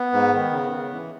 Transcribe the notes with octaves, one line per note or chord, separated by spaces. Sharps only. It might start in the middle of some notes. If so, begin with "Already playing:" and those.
Already playing: B3
G#2
D#3
C#3
C#3
E3